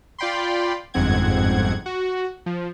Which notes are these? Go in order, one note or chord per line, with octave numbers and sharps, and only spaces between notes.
F4 D5 G5 B5 C6
G1 F2 G#2 C4 F#5 G#6
F#4
F3